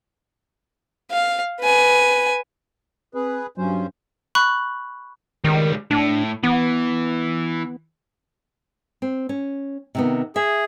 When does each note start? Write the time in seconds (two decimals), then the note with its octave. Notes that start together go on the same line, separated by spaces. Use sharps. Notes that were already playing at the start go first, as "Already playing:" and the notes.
1.11 F5
1.60 B4 G#5
3.15 C4 G#4 B4
3.58 G2 F#3 C#4 C5
4.35 B5 C#6 F#6
5.44 C#2 D#3 G3
5.91 A2 D4
6.43 E3 B3
9.02 C4
9.29 C#4
9.95 C3 D#3 B3
10.36 G#4 E5